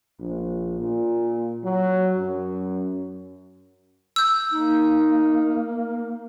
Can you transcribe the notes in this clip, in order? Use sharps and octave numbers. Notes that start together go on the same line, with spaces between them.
A#1
A#2
F#3
F#2
E6 G6
A#3 D#4